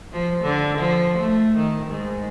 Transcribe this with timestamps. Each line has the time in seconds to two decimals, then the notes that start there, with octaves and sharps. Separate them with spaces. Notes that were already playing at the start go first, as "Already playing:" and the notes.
0.12 F3
0.42 D3
0.78 F3
1.19 A3
1.56 D#3
1.86 G#2